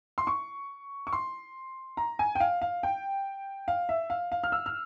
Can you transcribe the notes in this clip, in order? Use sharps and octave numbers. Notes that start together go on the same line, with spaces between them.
C6
C#6
C#6
C6
A#5
G#5
G5
F5
F5
G5
F5
E5
F5
F5
F6
E6
F6